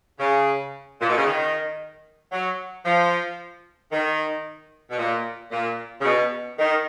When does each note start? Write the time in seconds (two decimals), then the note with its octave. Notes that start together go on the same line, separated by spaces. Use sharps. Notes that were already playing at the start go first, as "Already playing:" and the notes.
0.20 C#3
1.01 A#2
1.08 B2
1.18 C#3
1.26 D#3
2.32 F#3
2.85 F3
3.92 D#3
4.90 B2
4.98 A#2
5.52 A#2
6.01 C#3
6.05 B2
6.58 D#3